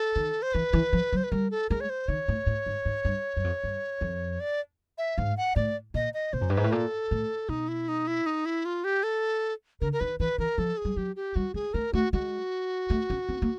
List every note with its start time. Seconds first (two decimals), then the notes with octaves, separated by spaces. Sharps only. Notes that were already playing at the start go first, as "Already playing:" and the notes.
Already playing: A4
0.16 D#3
0.42 C5
0.54 E3 B4
0.73 E3
0.93 F3
1.13 F#3
1.17 C5
1.24 B4
1.31 G3 A#4
1.51 A4
1.70 G#3 A#4
1.81 C#5
1.90 C5
2.08 D#3 C#5
2.28 A2
2.47 A2
2.66 G#2
2.85 G#2
3.05 G2
3.36 F#2
3.44 F2
3.64 G2
4.01 F2
4.40 D5
4.98 E5
5.18 G#2 F5
5.37 F#5
5.56 A2 D5
5.94 A#2 D#5
6.14 D#5
6.33 B2 C5
6.41 F#2
6.50 G2
6.52 G#2 B4
6.64 A2
6.72 A#2 A4
7.11 A2
7.49 B2 D#4
7.68 E4
7.88 D#4
8.07 E4
8.26 D#4
8.46 E4
8.65 F4
8.84 G4
9.03 A4
9.81 D3 A#4
9.93 A#4
10.00 D#3 B4
10.20 E3 B4
10.38 E3 A#4
10.58 F3 A4
10.77 G#4
10.85 G3
10.96 F#3 G4
11.16 G4
11.35 G3 F#4
11.54 G#3 G#4
11.74 A3 A#4
11.93 A3 F#4
12.13 G#3 F#4
12.90 A3
13.10 C#4
13.29 C4
13.42 A#3